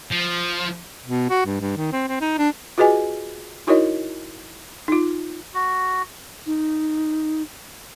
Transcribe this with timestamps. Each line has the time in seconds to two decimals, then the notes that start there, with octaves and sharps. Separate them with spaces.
0.11 F3
1.06 B2
1.30 F#4
1.46 G2
1.61 G2
1.76 D#3
1.92 C4
2.08 C4
2.21 D#4
2.38 D4
2.78 F4 F#4 G#4 B4 D#5 G#5
3.67 D#4 E4 F#4 A#4 C#5 D#5
4.88 D#4 F4
5.54 F#4
6.46 D#4